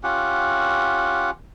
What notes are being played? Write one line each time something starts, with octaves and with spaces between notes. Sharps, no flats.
C#4 F4 G4 F#5